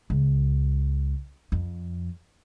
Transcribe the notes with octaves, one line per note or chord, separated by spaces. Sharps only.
C#2
F2